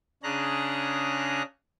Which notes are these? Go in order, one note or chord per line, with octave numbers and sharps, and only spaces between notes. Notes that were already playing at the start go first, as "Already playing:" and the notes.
C#3 C#4 D4 G#4 A#5 F#6